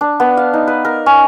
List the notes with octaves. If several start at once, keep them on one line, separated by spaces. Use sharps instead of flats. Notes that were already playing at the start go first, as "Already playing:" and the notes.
D4
B3
F5
D#4
B4
A#4
C#4